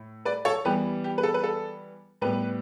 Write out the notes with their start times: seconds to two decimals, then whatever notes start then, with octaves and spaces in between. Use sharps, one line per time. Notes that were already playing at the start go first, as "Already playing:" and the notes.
Already playing: A2
0.25 B4 D5
0.45 A4 C#5
0.65 E3 G3 B3 G4 B4
1.04 G4
1.18 B4
1.23 A4
1.34 B4
1.43 A4
2.21 A2 G3 B3 G4 B4